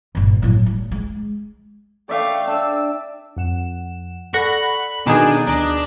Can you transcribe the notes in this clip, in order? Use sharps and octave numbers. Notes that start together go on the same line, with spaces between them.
G1 A#2
A2 F#3
G3
G#3
A3 D5 E5 F5 G5
D4 E6
F2 F#5 E7
A4 D5 F#5 B5 C#6 F#6 A#6
B2 D#3 D4 D#4 G#4 G#5
D2 D4 D#5